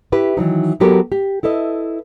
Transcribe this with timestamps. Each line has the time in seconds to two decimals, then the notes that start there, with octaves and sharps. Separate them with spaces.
0.12 E4 G4 B4
0.37 D#3 E3 F#3 D#4
0.80 F#3 B3 F#4 G4 A4 A#4
1.12 G4
1.43 E4 A4 B4 D#5